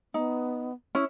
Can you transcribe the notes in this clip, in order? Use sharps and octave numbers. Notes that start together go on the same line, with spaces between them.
B3 D#4
C#4 E4